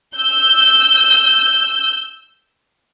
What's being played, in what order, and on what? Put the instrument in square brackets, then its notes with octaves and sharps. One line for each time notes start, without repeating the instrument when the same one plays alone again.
[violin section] E6 G6